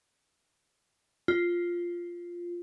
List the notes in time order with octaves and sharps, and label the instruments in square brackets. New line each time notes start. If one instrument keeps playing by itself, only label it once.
[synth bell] F4